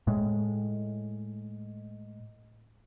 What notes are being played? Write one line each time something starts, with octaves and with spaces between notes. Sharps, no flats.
A2 G#3